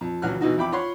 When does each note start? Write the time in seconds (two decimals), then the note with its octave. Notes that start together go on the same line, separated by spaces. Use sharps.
0.01 F2
0.22 C#2 E3 F#3 F#4 F6 F#6
0.41 B2 E3 D#4 F#4
0.57 F2 E4 G5 B5 D6
0.72 F4 C#5 F#5 B5 C6